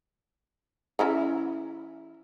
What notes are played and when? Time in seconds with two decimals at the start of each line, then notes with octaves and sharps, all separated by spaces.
0.99 E3 C#4 E4